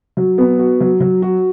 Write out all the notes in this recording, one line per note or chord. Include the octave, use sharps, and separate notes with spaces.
F#3
B3
F#4
F#3
F#3
F#4